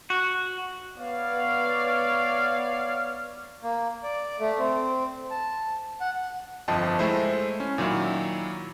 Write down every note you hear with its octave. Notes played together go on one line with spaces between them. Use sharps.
F#4
B3 C#5 D5 F5
A#3
D5
A3
C4
A5
F#5
G1 F2 F3 D#5 G5 A5
G#3 A3 E4 C5
C#4
A#2 D#3 F#3 E4